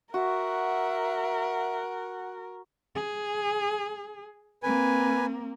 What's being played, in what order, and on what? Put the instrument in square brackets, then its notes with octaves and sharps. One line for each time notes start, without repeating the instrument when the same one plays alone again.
[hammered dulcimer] F#4 [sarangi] A#4 [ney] E5 [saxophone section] F#5
[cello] G#4
[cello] A#3 C4 [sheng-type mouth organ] B4 G#5